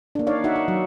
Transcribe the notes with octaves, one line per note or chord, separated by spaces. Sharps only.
A#3 D4
D#4 C#5 D5 F5
D#4 F#4 E5 F#5
D#4
F#3